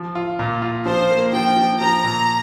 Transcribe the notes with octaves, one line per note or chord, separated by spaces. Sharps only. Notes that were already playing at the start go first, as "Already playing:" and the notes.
Already playing: F3
F4
A#2
F4
F3 C5
A#3
F3 G5
F3
F3 A#5
A#2